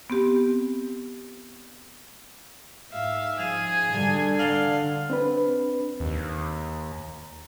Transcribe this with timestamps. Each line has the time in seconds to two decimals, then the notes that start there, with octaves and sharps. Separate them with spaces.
0.10 B3 C4 G4
2.92 G#2 E5 F5
3.39 F3 G#4 G#5
3.93 G2 D3
4.39 D5 F5 A#5 C6
5.10 C4 D4 B4
6.00 D#2